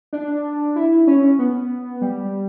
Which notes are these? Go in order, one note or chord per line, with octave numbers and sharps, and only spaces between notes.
D4
E4
C#4
B3
G3